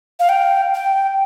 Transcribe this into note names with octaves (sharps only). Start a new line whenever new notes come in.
F5
G5
G5